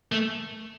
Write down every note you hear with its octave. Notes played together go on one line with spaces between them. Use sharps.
A3